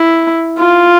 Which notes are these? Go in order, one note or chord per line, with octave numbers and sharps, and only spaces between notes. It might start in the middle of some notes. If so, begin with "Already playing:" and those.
Already playing: E4
F4